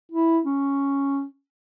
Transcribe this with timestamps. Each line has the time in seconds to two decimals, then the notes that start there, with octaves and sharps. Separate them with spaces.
0.12 E4
0.45 C#4